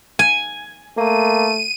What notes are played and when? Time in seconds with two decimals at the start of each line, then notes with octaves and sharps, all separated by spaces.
0.19 G#5
0.97 A3 A#3 D#7